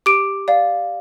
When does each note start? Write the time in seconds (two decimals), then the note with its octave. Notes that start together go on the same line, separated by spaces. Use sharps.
0.06 G4 D6 D7
0.48 D5 F5